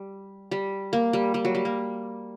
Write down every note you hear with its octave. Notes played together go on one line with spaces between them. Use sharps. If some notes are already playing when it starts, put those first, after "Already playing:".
Already playing: G3
G3
A#3
G3
G3
F#3
G3
A#3